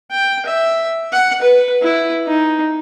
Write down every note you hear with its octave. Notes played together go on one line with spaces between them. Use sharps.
G5
E5
F#5
B4
E4
D#4